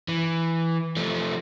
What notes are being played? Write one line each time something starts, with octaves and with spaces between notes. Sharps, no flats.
E3
F3 A3